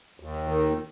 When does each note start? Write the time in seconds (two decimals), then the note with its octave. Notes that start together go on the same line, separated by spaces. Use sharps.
0.20 D#2
0.48 D#3